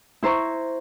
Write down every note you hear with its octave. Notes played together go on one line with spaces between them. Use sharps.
E4 C5 A#5 C#6